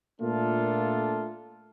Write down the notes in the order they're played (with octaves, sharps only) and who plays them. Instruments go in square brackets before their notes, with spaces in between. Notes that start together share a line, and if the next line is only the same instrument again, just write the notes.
[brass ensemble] A#2 A3 A#3 D4 F4 A4